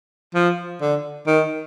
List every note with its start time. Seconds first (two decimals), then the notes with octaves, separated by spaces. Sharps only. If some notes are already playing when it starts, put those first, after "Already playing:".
0.35 F3
0.81 D3
1.27 D#3